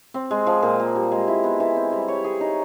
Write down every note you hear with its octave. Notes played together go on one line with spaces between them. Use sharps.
C4
G#3
F3
A#2
A#3
G3
G#3
E4
B3
E3
C4
G3
C#5
G#4
D#4